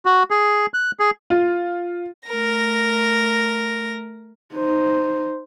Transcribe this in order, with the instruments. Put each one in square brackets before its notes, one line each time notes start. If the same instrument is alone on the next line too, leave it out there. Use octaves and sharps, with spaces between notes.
[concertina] F#4
G#4
F#6
G#4
[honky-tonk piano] F4
[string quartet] A3 A#4 A#6
[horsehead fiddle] D#4 C5